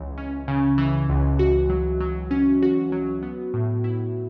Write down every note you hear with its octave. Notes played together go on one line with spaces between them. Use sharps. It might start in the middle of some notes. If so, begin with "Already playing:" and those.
Already playing: C#2 E3
C#4
C#3
E3
C#2
F#4
F#3
F#3
C#4
F#4
F#3
B3
A2
E4